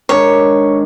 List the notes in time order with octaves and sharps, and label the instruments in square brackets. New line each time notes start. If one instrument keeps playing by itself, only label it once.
[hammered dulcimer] G#2 D#3 D4 [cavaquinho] C#5